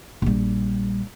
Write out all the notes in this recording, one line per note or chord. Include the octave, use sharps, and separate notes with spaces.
A#1 G3